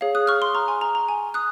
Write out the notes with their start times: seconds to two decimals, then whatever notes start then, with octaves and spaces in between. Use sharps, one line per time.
0.01 G#4 C#5 F5
0.15 D#6 F#6
0.27 C#6 F6
0.42 C6 D#6
0.55 A#5 C#6
0.68 G#5 C6
0.81 A#5
0.95 A#5
1.08 G#5
1.34 D#6 F#6